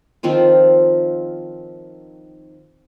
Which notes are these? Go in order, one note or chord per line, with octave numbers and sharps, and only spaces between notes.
D#3 F3 C4 F4